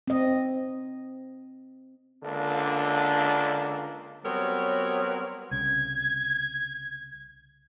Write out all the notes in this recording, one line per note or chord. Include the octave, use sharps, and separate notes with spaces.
C4 D#5
C#2 D3 A#3 D4
F#3 G3 B3 C4 A#4 C#5
C2 C#3 G#6